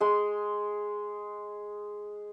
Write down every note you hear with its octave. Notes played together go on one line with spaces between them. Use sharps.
G#3 G#4